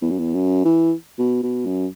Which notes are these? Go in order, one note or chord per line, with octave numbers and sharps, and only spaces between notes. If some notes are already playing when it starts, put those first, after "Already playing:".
E2
F#2
E2
F#2
E3
B2
B2
F#2